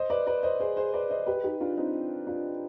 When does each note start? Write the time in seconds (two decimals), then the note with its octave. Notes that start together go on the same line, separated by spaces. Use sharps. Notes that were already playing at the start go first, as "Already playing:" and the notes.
Already playing: C5 D#5
0.10 B4 D5
0.27 B4 D5
0.43 C5 D#5
0.60 G#4 C5
0.76 G#4 C5
0.94 B4 D5
1.10 C5 D#5
1.26 G4 B4
1.44 D#4 G4
1.60 D4 F4
1.77 C4 D#4
2.27 D4 F4